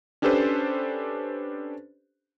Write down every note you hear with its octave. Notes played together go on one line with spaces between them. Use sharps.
C#4 D4 G4 A4 B4 C5